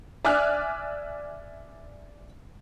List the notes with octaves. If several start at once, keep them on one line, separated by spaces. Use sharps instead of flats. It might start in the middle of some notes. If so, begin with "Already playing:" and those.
D5 E5 G#5 D6 F6 F#6